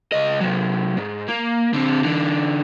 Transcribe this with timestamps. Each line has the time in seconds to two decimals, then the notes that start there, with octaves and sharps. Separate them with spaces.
0.12 C#2 D#5
0.40 C3 F#3
0.97 G#2
1.28 A#3
1.74 D3 C4
2.04 D3 E3